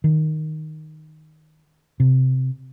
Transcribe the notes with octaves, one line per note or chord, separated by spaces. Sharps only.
D#3
C3